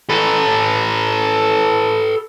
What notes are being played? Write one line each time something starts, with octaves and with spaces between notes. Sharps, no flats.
A4 B4